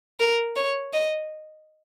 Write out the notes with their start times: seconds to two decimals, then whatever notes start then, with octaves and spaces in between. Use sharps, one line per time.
0.20 A#4
0.56 C#5
0.93 D#5